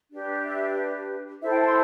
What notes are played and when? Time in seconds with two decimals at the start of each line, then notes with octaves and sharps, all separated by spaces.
0.12 D4 G4 B4
0.44 E5
1.42 E4 A4 C5 E5
1.50 G5
1.59 A5
1.66 C6